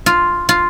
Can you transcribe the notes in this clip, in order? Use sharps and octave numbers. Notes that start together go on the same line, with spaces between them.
F4
F4